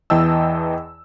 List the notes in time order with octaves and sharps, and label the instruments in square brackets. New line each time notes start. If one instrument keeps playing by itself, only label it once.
[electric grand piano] E2 E3 D#5 G5 A5 E6